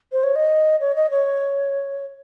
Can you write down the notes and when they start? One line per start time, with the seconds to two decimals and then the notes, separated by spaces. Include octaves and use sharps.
0.12 C5
0.24 C#5
0.36 D#5
0.81 C#5
0.96 D#5
1.11 C#5